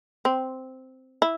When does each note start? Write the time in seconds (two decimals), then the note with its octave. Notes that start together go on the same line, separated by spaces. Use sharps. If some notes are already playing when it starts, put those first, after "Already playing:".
0.25 C4
1.22 E4